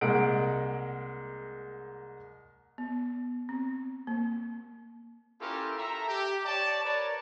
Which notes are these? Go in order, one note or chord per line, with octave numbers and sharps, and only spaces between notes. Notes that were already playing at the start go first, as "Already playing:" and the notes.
C2 G#3 A#3 F#5 D7
B3
C4
A#3
C#4 E4 F4 G4 A4 A#4
A4 E5 A#5
G4
C#5 D5 A5
A#4 B4 C#5 D5